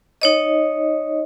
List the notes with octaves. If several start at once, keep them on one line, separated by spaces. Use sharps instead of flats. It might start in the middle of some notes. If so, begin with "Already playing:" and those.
D#4 C#5 D#5